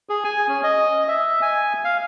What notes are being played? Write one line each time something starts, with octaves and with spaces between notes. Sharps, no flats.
G#4
G#5
C#4
D#5
E5
G#5
F5